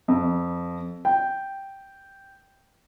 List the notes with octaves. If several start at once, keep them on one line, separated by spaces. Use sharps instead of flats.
F2
G5